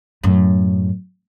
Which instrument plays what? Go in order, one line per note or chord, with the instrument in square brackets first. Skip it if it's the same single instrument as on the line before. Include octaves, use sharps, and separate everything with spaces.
[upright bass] F#2 A2